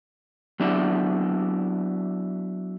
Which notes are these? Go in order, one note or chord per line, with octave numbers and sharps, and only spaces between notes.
F#3 B3 D4 E4